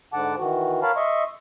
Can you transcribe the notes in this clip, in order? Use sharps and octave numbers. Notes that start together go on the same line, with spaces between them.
G#2 D3 F#5 A5 D6
D#3 E3 F#4
A#4 C#5 F5 A5 B5
D#5 E5 C6 C#6